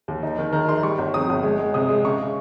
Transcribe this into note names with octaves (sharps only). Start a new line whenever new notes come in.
D#2
D#4
D#3
D#3 A#5
D#4 C6
G3 C#6
G1
C4 D#6
G1
G#3
G#3
C3 D#6
G#3
C#3 C#6
C#3